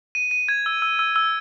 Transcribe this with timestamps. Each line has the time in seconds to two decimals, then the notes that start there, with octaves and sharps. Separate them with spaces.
0.15 D#7
0.31 D#7
0.49 G#6
0.66 E6
0.82 E6
0.99 E6
1.16 E6